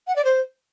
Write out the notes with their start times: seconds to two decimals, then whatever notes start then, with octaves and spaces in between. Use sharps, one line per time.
0.07 F#5
0.16 D5
0.25 C5